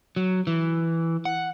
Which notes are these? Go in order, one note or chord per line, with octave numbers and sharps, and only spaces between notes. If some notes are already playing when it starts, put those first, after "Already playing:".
F#3
E3
F#5